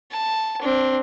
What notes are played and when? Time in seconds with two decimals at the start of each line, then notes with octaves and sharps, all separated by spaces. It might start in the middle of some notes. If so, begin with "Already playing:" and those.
0.12 A5
0.62 C4 D4